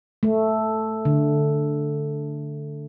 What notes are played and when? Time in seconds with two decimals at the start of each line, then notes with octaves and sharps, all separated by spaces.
0.23 A3
1.05 D3